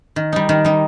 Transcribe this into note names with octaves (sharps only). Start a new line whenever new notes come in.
D#3
G3 D#4
D#3
G3 D#4